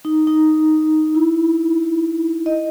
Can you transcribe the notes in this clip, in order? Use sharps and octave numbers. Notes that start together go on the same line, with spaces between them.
D#4
D#4
E4
D#5